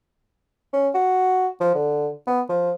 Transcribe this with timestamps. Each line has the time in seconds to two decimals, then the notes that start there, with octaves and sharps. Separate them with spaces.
0.73 C#4
0.94 F#4
1.61 F3
1.75 D3
2.27 B3
2.49 F3